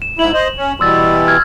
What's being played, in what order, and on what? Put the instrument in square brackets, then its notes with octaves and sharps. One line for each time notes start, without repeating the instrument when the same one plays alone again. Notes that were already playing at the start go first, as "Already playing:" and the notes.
[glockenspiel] E7
[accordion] G#2 E4 [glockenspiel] F#7
[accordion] C5 D#5
C#4
[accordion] B2 E3 G3 [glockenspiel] C6 E6 A6
[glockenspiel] F6 G#6